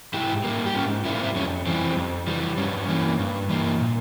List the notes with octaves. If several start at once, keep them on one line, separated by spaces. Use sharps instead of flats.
G#2 E4 G4
G3 A#3
G4
G#2 C#4 F4
G3 A#3 E4
F4
C4 E4
F2 C#4
E3 G3 C4
F2
E3 G3
G2 C#4
E3 A#3
G2
E3 A#3
A#2